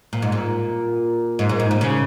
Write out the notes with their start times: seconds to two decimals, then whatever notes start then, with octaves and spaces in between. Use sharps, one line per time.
0.13 A#2
0.22 G#2
0.32 A#2
1.39 G#2
1.49 A#2
1.60 G#2
1.71 A#2
1.81 C#3